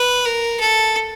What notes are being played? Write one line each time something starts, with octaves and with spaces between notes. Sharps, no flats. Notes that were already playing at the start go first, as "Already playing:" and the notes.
Already playing: B4
A#4
A4